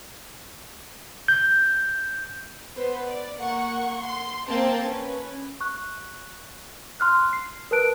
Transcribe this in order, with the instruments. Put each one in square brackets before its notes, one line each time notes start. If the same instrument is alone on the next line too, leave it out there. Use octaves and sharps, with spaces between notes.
[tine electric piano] G6
[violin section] B3 B4 C5
D5
A#3 F#5 C#6
C6
A#3 C4 A#4 G5 A5
C#4 B4
[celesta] C#6 F#6
C6 F6 F#6
C7
A#4 B4 A5 F#6 D7